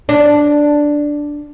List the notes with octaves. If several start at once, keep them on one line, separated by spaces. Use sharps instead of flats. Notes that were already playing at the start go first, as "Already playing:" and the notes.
D4